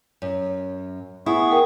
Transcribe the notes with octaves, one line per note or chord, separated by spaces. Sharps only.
F#2
B3 E4 G#4 C#6
A#4 G5